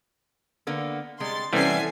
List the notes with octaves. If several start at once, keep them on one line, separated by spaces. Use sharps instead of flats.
D3 A#3 B3
C3 G3 G#3 C6 A6
C3 E3 G3 B3 C#4 A4 G#5 C7